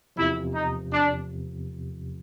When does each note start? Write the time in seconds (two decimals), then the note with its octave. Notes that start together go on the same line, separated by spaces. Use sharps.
0.16 E2 C3 F3 E4
0.54 D#4
0.92 D4